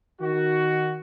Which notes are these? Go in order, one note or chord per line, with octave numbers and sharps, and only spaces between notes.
D#3 F#4